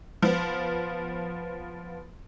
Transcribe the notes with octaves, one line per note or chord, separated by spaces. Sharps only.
F3 B3